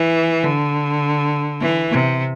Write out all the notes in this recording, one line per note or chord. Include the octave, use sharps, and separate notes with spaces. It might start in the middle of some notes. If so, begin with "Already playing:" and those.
Already playing: E3
D3
E3
C3